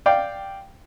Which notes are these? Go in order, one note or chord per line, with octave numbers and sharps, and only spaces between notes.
D5 F5 G5